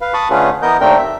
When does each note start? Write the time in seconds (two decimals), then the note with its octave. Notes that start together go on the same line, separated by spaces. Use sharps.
0.01 B4 F5
0.14 A5 B5 C#6 D#6
0.30 D3 A3 C#4 F4 G#4 B4
0.62 E3 B3 A#4 D#5 G6
0.81 D#2 A3 C4 D4 A#4 G5
0.98 E5